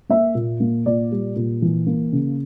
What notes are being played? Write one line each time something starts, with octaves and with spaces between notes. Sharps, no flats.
A#3 E5
A#2
A#3
A#2 D5
G3
A#2
E3
A#3
C#3